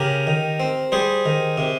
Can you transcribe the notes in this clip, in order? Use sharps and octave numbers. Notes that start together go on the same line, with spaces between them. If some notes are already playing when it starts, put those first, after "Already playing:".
Already playing: C#3 G4 A#4
D#3
C4
G3 G#4 C5
D#3
C3